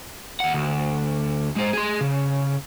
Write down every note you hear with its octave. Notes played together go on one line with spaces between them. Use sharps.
D#2 F#5
D2
G#3 C5
G#4 C6
C#3